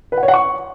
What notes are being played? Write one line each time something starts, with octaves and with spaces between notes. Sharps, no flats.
B4
F#5
C#5
F#5
C#6